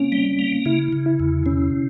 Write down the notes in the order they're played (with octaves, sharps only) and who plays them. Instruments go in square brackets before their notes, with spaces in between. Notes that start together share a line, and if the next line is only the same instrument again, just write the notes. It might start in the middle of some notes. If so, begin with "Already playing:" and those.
Already playing: [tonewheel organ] A#3 [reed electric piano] C4 C#4
[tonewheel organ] G3
A#3
[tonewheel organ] C#3 [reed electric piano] E4
[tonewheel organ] C#3
[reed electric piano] E4
[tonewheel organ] E2
[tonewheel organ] C3 [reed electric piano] C#4